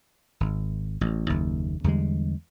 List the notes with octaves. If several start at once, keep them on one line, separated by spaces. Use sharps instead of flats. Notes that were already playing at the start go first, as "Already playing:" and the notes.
G#1
A1
F#1 D#2
E2 D3 G3 G#3